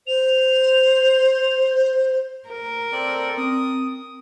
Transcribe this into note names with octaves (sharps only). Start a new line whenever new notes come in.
C5 F7
A#4
C4 A4 D5
C4 D#6